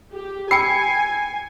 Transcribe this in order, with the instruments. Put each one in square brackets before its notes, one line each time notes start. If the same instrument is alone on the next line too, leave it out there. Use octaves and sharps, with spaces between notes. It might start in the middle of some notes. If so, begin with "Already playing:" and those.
[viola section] G4
[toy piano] G5 B5 E6 [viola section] G#5 [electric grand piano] C7 C#7